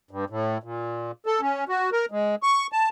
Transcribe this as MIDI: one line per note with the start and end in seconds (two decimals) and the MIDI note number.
0.11 0.25 43
0.30 0.58 45
0.63 1.11 46
1.26 1.41 69
1.41 1.64 61
1.69 1.90 66
1.92 2.06 70
2.11 2.35 56
2.43 2.67 85
2.72 2.89 81